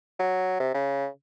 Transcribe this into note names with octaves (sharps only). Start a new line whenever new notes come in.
F#3
C3
C#3